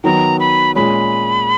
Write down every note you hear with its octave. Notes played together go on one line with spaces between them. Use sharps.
D#3 F#3 B3 A#5
B5
A#2 G#3 C#4 B5